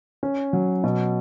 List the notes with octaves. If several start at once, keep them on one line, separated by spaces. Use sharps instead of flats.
C#4
F#3
B2